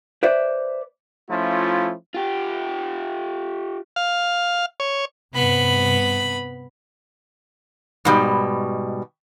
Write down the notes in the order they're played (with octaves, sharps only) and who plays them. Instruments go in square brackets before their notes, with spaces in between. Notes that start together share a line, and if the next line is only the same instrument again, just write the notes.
[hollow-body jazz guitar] B4 C5 D5 E5
[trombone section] F3 A3 C#4 E4 F4
[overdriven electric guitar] F4 G4
[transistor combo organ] F5
C#5
[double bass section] G2 C3 [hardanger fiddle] B3 B5
[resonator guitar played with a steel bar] G#2 B2 G3